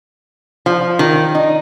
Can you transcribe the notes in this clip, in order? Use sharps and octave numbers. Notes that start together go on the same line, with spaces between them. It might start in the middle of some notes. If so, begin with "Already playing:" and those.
F3
D#3
D#4